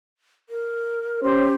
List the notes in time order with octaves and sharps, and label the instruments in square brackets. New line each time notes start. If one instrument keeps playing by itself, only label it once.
[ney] A#4
[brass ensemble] C#4 C5 [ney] G4